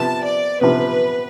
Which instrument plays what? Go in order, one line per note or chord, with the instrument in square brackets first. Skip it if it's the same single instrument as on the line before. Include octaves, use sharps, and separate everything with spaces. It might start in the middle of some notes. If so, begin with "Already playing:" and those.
Already playing: [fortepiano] C3 F3 B3 [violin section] A5
[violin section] D5
[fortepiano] C3 F3 B3 [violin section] B4